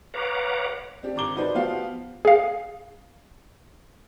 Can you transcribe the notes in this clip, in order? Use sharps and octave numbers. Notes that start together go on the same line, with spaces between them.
B4 C#5 F5 F#5 A#5 D6
C4 D4 G4
G#1 A#5 D6 G7
D#4 F#4 B4 C5 D5
F3 B3 F#4 G4 F5
G#4 F5